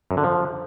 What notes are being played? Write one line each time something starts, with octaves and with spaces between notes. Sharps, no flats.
F#2
D3
F3